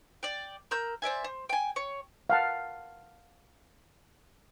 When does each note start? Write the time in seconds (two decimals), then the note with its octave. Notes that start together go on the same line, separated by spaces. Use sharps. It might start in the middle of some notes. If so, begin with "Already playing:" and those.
0.23 D5 G5
0.71 A#4 E6 G6
1.02 C5 D5 E5 G#5
1.24 C5
1.49 G5 G#5
1.76 C#5
2.30 F5 F#5 A5